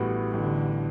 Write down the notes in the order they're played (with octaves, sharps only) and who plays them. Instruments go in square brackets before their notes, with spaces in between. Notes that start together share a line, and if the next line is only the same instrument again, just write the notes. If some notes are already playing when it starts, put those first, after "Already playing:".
Already playing: [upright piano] A1 A2 G3 B3 F#4
[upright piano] A1 [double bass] D3